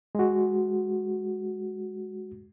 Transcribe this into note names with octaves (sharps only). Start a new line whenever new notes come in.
G#3 F#4